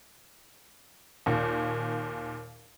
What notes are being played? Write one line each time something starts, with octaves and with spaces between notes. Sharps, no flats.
D#2 A#2